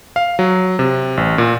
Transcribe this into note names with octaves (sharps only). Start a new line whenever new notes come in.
F5
F#3
C3
A1
A#2